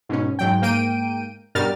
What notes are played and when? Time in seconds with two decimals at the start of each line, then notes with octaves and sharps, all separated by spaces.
0.09 G#2 B2 C#4
0.39 G#2 F#3 G5
0.61 G#2 A#3 G5 D7 D#7
1.55 G2 B2 G3 A#4 F6 A6